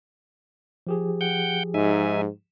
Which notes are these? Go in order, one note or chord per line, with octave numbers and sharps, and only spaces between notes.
F3 G4 G#4
F#5 G5 G6
G#2 D#4 E5 G#5